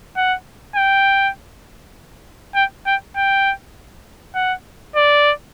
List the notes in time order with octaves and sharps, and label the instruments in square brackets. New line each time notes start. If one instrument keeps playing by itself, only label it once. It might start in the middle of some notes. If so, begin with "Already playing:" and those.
[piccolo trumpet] F#5
G5
G5
G5
G5
F#5
D5